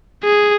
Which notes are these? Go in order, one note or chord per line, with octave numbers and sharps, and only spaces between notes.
G#4